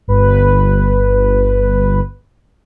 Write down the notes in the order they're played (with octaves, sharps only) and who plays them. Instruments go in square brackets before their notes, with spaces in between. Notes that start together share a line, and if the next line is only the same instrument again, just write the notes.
[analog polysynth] G1 B4